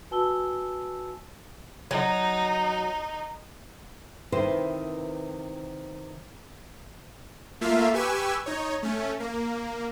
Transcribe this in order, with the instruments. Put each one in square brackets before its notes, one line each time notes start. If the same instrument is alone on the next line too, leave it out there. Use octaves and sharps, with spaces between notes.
[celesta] F#4 B4 G#5 A5 E6 G7
[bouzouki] F#3 [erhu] D#4
[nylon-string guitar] C3 D#3 E4 B4 C5
[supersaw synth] A3 A#3 F4 E5 F5
G4 B4 G#5 C#6 E6
D#4 C#5
A3 C#4
A#3